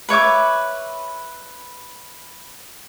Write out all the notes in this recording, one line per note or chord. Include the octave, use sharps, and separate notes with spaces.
B4 C#5 E5 D6